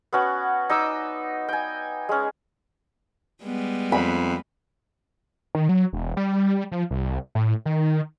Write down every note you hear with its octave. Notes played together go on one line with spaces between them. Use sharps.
B3 C#4 F#4 F#5
D#4 D#5 D6 E6
G5 G#5
G#3 C#4
G3 G#3 B3
F2 B5
D#3
F#3
E1
G3
F3
C2
A2
D#3